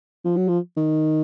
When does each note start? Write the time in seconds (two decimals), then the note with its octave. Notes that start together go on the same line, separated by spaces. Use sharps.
0.25 F3
0.36 F#3
0.48 F3
0.77 D#3